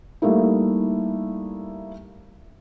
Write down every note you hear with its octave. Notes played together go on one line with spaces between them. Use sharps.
G3 A3 A#3 D#4 E4